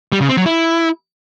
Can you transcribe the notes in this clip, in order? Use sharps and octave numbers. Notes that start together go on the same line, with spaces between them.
G3
C#3
C4
F#3
E4